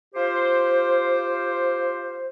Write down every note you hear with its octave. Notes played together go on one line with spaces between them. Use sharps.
F4 G4 C5